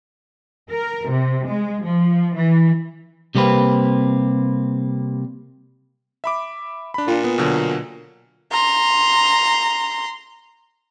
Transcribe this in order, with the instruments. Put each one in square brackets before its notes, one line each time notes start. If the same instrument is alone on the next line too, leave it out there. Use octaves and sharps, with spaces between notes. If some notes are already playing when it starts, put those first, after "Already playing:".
[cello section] A#4
C3
G#3
F3
E3
[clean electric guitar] C3 G3 A#3 C4 B4
[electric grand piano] E5 B5 D6
D4 B5
[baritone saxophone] A#2 [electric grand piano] D4 F4
[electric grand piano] B3
B2 D3 F#3
[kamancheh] A#5 C6